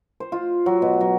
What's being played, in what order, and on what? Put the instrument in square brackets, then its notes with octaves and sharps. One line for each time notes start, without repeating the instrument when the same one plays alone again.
[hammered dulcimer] C5
F4
F#3
B2
F#3